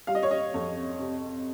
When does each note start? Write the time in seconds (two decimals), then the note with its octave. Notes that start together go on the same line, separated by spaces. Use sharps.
0.07 G3 F5
0.15 D#5
0.23 C#5
0.31 D#5
0.54 F2
0.99 C3